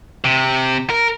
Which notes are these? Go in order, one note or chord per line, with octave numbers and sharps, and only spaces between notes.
C3
A#4